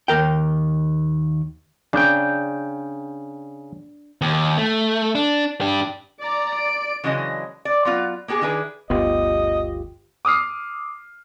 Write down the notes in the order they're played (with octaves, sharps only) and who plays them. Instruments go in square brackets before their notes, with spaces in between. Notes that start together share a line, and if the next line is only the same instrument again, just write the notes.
[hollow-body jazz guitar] D#2 A#4 G5
[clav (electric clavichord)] C#3 G5 [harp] D4 G6
[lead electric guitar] D#2
A3
D4
D4 G4
[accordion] D5 [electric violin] A#5 D6
[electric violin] D7
[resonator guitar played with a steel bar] C#3 E3 F#3 G#3 D4 D#5
D5
F#3 B3 F4
A#3 B3 G4 G#4
D#3 D4 E4 G#4 B4
[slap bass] G1 D2 B3 [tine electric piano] F4 G4 [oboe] D#5
[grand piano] D6 D#6 F6 C7